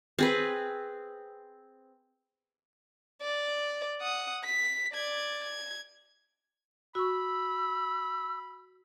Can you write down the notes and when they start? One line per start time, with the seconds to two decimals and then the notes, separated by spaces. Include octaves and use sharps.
0.19 C4 G#4 B4
3.22 D5
4.01 F#5 D#6
4.45 B6
4.94 D5 G#6
5.45 G#6
6.95 F#4 B5 C#6 E6